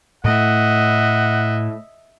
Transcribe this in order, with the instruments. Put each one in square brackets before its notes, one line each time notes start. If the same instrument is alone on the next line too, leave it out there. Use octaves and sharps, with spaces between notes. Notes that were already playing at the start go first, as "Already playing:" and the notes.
[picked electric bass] A2 A3 [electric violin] D#5 E5 [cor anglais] F#5